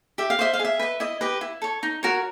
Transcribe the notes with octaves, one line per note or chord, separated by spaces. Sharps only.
G4 E5
F5
C5 D#5 E5
F5
G#4
E5
B4 D#5
E4 D#5
G4 B4 D#5
E4
A4 C#5
D#4
F#4 A#4 C#5